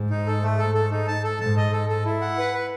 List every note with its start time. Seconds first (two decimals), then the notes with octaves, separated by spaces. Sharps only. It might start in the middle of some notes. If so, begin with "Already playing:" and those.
Already playing: G#2
0.10 D#4
0.26 A4
0.43 A3
0.59 A4
0.75 A4
0.91 D#4
1.08 A5
1.24 A4
1.40 G#2 A5
1.57 D#5
1.73 A4
1.89 A4
2.05 E4
2.21 F#5
2.38 B4
2.54 B4